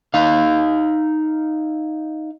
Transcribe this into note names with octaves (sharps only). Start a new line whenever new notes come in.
D#4 F5